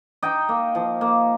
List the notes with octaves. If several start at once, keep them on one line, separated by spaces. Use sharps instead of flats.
D#4 D#5 G5
A#3
F3
A#3